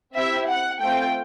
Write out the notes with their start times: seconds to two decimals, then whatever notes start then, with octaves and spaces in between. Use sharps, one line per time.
0.15 C4 E4 G4 E5
0.48 F#5
0.80 A3 C4 F4 G5